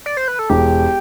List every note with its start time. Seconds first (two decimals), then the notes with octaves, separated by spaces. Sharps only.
0.06 D5
0.17 C5
0.28 B4
0.39 A4
0.50 E1 G4